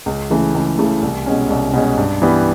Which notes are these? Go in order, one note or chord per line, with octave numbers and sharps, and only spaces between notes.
C#2
C#3 E3 A3
C#2
C#3 E3 A3
C2
B2 G#3 C#4
C2
B2 G#3 C#4
G2
E3 G3 B3